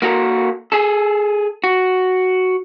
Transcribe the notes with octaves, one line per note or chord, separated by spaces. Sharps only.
A#3 F#4 A4 A#4
G#4 A4
F#4